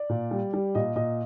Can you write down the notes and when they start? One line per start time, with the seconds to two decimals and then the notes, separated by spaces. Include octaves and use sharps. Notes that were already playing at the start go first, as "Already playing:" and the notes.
Already playing: D5
0.09 A#2
0.31 G3
0.54 G3
0.75 A#2 D#5
0.96 A#2 D#5